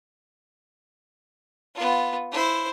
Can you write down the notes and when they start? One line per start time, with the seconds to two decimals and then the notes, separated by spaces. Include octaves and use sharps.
1.75 B3 F4
2.31 E4 C5